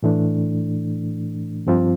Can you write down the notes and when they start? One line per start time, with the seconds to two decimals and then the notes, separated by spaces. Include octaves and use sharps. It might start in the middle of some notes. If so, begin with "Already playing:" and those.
0.03 A2 E3 A3 D4
1.67 G2 F3 C4 F4